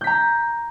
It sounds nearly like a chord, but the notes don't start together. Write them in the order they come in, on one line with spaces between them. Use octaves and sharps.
G6 B6 A#5